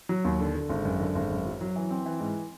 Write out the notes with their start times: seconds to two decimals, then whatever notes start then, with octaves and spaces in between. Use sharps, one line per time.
0.09 F#3
0.24 D#2
0.40 D3
0.55 D3
0.69 G#1
0.85 F#2
1.00 D3
1.15 G#1
1.30 F#2
1.46 F#3
1.61 F#3
1.76 E3
1.90 C4
2.06 E3
2.20 G#2